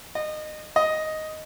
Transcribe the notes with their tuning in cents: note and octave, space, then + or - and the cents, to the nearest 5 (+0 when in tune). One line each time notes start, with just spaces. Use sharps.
D#5 -25
D#5 +5